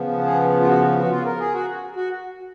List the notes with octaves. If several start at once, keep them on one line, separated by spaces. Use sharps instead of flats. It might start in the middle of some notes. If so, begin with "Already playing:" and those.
Already playing: C#3 F3 B3
G#4
F4
F#4
F#4
F4
A#4
G#4
F#4
F#4